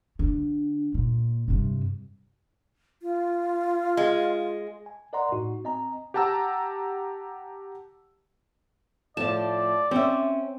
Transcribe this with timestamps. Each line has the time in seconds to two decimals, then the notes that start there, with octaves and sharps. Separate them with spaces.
0.19 D3
0.94 A#2
1.48 G2 C3
3.02 F4
3.97 G#3
4.86 G#5
5.13 A#4 D5 D#5 F#5 A#5 C6
5.32 A2 D#4 F#4
5.64 C4 D#5 G#5 A#5
6.14 G4 F#5 A5 A#5 E6
9.17 A2 F3 D5 A5
9.91 C4 C#4 E5